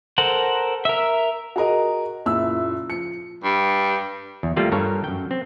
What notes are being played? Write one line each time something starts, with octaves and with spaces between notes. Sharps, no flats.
A4 A#4 C5 F#5
A#4 E5
F#4 G#4 A#4 D#5
F#1 A#2 E4 E6
F3 C#7
G2
E2
G3 A3 A#3 F4 G4 D5
G2 A4 A#4 C#5 A5
F#2 G5
C4